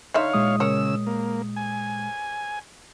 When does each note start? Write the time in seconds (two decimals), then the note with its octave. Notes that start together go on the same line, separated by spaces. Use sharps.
0.14 D3 D#4 C#5 E5 F5
0.34 A#2 G#3 D#6
0.60 C#3 A#4 C#5 E6
1.06 A#3
1.56 G#5